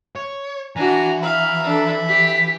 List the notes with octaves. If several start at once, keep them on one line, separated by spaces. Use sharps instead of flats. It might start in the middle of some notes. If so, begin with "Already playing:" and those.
C#5
E3 D4 F#4 G#5 A#5
E5 F5 A#5 B5
D4 A4
G4 B6